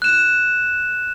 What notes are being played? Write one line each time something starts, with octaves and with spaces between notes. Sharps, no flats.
F#6 E7